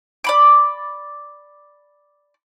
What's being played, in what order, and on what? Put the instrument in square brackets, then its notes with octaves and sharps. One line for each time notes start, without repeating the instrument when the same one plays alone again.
[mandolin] D5 B5 D6